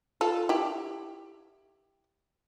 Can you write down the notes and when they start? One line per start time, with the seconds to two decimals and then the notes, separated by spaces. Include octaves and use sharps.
0.21 F4 A4
0.49 E4 G4